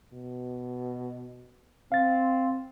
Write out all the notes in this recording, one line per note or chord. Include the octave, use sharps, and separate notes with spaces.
B2
C4 F5 A6